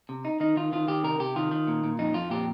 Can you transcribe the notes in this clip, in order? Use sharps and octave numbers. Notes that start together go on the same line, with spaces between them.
C3
D#4
D#3 D#4
D#3 F4
D#3 F4
D#3 G4
C3 A#4
C3 G4
D#3 F4
D#3
A#2
A#2
F2 D#4
F2 F4
A#2 G4